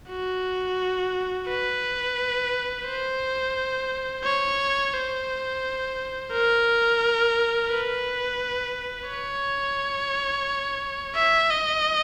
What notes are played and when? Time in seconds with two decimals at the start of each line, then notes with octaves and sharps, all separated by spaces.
0.09 F#4
1.48 B4
2.87 C5
4.24 C#5
4.93 C5
6.32 A#4
7.70 B4
9.08 C#5
11.15 E5
11.50 D#5